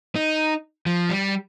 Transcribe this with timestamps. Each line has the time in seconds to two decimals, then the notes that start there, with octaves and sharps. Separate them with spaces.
0.16 D#4
0.86 F3
1.09 G3